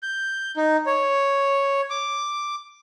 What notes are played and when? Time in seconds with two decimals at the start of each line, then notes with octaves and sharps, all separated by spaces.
0.03 G6
0.57 D#4
0.86 C#5
1.90 D6